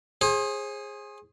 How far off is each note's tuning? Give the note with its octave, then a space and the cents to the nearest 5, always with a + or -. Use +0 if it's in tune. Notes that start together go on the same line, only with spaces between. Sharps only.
G#4 -5 C5 +40